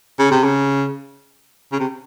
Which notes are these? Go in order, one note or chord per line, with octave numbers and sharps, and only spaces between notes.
C#3
C3
C#3
C#3
C3